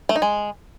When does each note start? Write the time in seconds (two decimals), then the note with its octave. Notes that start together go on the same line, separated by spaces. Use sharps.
0.09 A3
0.16 D#4
0.22 G#3